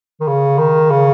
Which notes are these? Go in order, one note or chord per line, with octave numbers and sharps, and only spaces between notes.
D#3
C#3
D#3
C#3